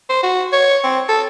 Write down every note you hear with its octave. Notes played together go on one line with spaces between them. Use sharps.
C5
F#4
C#5
C4
A4